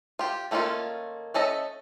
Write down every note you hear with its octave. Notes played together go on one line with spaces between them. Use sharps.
F4 G4
D#3 A3 A#3 C#4 F4
A3 C#4 A4 D#5 E5